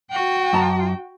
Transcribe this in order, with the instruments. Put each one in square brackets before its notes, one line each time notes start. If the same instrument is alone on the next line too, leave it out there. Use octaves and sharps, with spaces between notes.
[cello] F#4 G5
[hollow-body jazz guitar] F#2 A5 A#5